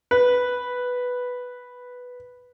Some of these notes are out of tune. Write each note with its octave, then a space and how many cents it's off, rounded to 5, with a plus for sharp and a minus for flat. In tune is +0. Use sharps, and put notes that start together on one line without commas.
B4 +0